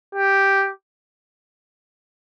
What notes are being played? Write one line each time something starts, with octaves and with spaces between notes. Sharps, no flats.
G4